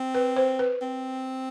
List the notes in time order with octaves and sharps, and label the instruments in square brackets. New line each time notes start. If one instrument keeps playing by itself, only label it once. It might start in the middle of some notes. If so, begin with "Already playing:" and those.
Already playing: [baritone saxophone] C4
[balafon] B4
C5
B4
[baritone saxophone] C4